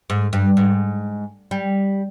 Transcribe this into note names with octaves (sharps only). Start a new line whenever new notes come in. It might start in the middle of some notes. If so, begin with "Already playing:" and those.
G#2
G2
G#2
G3